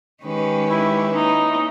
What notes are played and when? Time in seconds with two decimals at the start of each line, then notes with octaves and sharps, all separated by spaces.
0.23 D#3 G#3 C#4 G4 B4
0.68 E4
1.15 A#3 C#4 D#4 E4